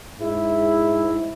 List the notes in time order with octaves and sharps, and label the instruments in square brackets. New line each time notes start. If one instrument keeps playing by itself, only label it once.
[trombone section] G#2 G#3 E4